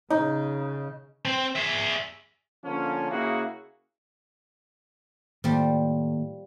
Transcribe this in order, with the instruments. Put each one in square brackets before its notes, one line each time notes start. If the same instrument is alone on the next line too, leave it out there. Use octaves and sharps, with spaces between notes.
[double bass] C#3 [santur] D#4
[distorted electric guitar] C4
G#4 E5
[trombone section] D3 F3 A#3 C#4
C#3 A#3 E4 F#4 G#4
[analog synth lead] A2 [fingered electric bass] D#3 A#3 [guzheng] F3 G3